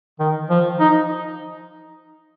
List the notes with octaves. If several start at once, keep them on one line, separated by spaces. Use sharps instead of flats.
D#3
F3
D#4